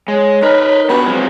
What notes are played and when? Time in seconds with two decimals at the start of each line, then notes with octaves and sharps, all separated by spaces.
0.08 G#3 C#5
0.43 D#4 A#4 B4
0.90 B3 D4 F#4 G4 B4
1.06 F3 F#3 G#3 C4